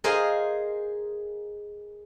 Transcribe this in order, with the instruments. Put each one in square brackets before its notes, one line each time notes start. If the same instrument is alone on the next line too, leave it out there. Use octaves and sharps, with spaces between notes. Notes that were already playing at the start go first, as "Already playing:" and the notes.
[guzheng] G#4 A#4 C5 D#5 F5